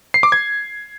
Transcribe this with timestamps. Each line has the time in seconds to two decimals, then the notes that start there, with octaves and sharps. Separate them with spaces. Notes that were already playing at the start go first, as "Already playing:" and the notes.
0.14 C7
0.23 D6
0.32 G#6